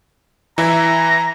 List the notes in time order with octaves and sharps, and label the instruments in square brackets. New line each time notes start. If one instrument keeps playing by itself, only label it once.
[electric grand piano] E3 E4 E5 [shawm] A#5